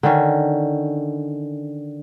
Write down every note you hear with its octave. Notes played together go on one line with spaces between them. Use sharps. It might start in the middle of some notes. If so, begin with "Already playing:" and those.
D3 D#3 C#4